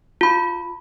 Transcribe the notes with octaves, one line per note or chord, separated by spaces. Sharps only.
F4 B5